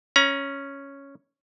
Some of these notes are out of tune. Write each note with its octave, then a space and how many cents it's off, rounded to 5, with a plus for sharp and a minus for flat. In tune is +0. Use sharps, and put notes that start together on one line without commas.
C#4 +0 A#5 +30